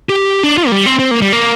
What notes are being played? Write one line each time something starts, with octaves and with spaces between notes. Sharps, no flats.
G4
D4
F4
A#3
G3
C4
C4
A#3
G3
A#3